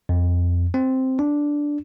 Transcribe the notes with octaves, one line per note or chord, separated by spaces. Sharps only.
F2
C4
D4